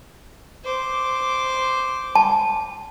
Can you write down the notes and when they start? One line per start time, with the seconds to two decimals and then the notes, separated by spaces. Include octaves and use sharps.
0.64 C5 D6
2.15 A5